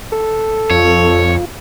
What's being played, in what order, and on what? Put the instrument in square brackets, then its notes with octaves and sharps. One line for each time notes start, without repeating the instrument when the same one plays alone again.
[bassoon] A4
[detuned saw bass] F2 [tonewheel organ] F4 [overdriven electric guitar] C#5